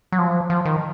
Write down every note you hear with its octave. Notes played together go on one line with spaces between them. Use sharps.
F#3
F3
F3
D#3